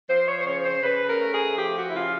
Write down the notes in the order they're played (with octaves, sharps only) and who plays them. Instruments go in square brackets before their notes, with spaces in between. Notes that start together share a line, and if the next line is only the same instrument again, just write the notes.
[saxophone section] F3 C5
C#5
C5
C#3 C#5
C5
C#3 B4
A#4
A3
G#4
F3 G4
F#4
E4
C#3 F4